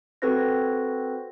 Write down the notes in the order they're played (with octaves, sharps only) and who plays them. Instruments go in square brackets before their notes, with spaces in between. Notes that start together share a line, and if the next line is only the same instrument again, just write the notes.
[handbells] C4 F#4 A4 B4 C5 A#6